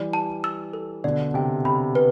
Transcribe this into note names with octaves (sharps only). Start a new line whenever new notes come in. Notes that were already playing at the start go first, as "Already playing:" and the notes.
Already playing: E3 G3 D5
A5
E6
A4
B2 D3 D5
C3 G5
C3 B5
B4